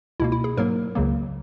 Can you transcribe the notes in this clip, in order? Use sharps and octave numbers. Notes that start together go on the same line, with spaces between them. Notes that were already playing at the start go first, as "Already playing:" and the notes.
C#2 B2 A#3 E4
E4
G#4
G#2 F#3 A#3 A#4
C#2 C#3 F#3 A#3